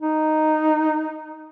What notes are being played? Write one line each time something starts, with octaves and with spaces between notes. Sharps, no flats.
D#4